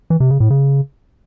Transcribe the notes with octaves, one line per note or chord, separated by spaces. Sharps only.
E3
C3
C#3
A2
C#3